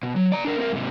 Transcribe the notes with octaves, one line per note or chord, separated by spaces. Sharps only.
B2
F#3
D5 A#5
D4 A#4
C4 A#4
G#2 C3